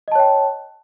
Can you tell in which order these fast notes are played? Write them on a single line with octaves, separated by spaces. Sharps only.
D#5 A5 C#5 G5